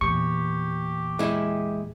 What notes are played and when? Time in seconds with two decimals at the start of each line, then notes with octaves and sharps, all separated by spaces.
0.01 E2 A#2 G4 C#6
1.19 G#3 E4